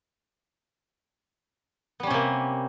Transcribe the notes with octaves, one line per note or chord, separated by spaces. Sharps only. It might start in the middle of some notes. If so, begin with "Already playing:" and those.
C3 G3 A#3 B3 C#4